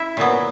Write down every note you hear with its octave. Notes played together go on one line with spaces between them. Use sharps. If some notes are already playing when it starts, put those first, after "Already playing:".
Already playing: E4 E5
A#2 F#3 B3